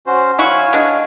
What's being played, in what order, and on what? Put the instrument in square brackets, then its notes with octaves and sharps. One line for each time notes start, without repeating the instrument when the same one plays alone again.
[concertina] C#4 F#4 C5
[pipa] F#3 E4 F#4 [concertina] C#5 F5 G#5
[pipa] G#3 D4